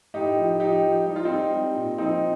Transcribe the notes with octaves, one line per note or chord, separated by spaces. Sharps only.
A2 D#4 G4
F3
F3 D#4 G4
F3
G3 D#4
F4
G3 C4 D#4
G3
A#2
F3 C4 D#4